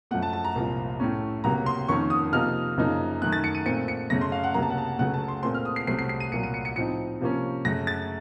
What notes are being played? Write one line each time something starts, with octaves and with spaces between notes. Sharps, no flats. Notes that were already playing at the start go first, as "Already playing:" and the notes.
F#2 F3 A3 F#5
A5
A5
A#5
C2 A#2 F3
A2 A3 C#4
C#2 C3 F#3 A#3 A#5
C6
F2 D#3 A#3 C#4 C#6
D#6
C3 F3 A#3 D#4 F6
F#2 C#3 F3 A#3 D#4
F#2 D#3 A3 F#6
A6
C#7
D#7
A#2 A3 C4 C#7
C#7
F#2 C#3 A3 C#4 A#6
C6
F5
F#5
C#2 C3 F#3 A#3 A#5
A5
F#5
A5
C#2 C#3 F#3 A3 F#5
A5
C6
A#2 A3 C4 C6
F6
D#6
C7
C2 C3 F#3 A3 C4 C7
C7
C7
D#7
C2 A#2 F#3 C#7
D#7
C#7
C#7
A2 F3 C4 D#4 C#7
C3 F3 A#3 C#4
F#2 C#3 A3 A#6
A6